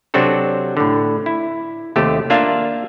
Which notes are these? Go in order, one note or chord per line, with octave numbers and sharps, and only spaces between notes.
C3 F#3 C4 D4 F#4 A4
A2 D3
E4
D#2 C3 A3 G4
A#3 D4 F4 E5 F5